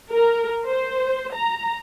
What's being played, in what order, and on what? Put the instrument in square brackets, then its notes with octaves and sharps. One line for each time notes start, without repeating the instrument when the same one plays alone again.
[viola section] A#4
C5
A#5